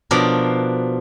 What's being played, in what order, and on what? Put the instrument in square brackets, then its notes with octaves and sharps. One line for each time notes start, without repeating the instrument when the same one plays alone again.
[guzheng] B2 F3 D4 A#4